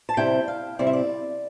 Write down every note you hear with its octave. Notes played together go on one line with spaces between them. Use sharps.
A5
C3 G3 C4 E4 G5
F5
C3 G3 C4 E4 D5
E5
D5